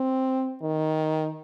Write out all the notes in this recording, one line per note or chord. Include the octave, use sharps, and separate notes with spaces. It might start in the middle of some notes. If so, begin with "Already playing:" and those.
Already playing: C4
D#3